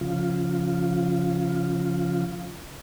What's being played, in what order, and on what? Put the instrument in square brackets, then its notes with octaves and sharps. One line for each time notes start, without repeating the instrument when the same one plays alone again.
[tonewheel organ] C#3 F3 F4